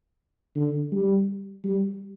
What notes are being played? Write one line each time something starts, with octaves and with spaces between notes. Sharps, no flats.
D3
G3
G3